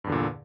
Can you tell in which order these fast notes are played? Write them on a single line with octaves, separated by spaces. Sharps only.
G2 E2 D3 A#2